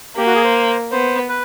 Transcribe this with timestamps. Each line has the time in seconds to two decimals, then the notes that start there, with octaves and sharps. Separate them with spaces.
0.17 A#3 G4
0.26 F#4
0.35 G#4
0.44 C5
0.92 B3 C5
1.29 B4